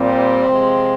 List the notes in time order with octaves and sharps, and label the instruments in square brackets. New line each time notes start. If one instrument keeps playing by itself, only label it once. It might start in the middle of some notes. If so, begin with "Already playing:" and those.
Already playing: [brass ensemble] A#2 G3 C4
C3 F3 G#3